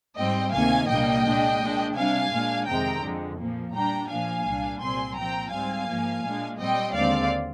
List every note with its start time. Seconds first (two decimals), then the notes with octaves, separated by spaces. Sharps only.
0.17 G#2 G3 C4 D#5 G5
0.53 D2 C3 D#3 A#3 F5 G#5
0.88 C2 A#2 G3 A#3 D4 D#5 G5
1.24 A#2 G#3 D4
1.61 A#2 G#3 D4
1.95 C3 G3 D4 F5 G#5
2.32 A#2 G#3 D4
2.67 F2 C3 D#3 G#3 C4 G5 A#5
3.02 F2 D3 F3 G#3
3.38 A#2 F3 A#3
3.73 A#2 G3 D4 G5 A#5
4.09 A#2 F3 A#3 D4 F5 G#5
4.45 C2 A#2 G3 D4
4.80 C2 A#2 G3 C4 G#5 C6
5.16 A#2 F3 C4 G5 A#5
5.52 G#2 G3 C4 F5 G#5
5.88 G#2 F3 A#3
6.23 A#2 G#3 D4
6.59 A#2 G3 C4 D#5 G5
6.94 D#2 D3 G#3 C4 D5 F5